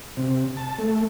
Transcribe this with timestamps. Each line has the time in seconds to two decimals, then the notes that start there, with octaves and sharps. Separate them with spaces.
0.17 C3
0.57 A5
0.78 A3